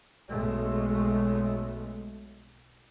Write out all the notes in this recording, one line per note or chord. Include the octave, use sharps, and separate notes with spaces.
B1 G#3 A3